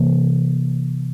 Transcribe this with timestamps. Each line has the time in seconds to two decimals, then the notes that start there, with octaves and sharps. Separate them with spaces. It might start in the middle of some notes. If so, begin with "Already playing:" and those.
Already playing: C3 E3 A#3